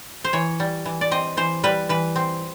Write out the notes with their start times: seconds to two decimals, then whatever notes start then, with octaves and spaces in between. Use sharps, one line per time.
0.24 C5
0.33 E3 C#5
0.60 G3
0.85 E3
1.01 D5
1.11 C4 D#5
1.37 E3 C5
1.64 G3 B4
1.89 E3 B4
2.16 C4